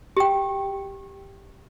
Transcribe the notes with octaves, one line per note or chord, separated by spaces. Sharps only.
G4 G5